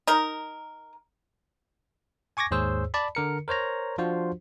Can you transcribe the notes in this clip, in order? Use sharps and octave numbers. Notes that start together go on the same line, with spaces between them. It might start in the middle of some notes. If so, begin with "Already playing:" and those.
D#4 A#4
G#5 C#6 D6 G#6 A#6
D#2 G#2 G#4 C5 C#5 E6
D5 A5 B5
D3 A#4 C#7
A#4 C5 C#5 A#5
F3 D4 F4 F#4 C5